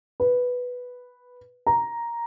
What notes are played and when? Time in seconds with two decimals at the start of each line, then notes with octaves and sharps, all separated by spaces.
0.20 B4
1.67 A#5